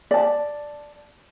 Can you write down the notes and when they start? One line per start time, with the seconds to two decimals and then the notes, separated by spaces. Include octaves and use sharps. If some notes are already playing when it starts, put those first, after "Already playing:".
0.11 D5 A5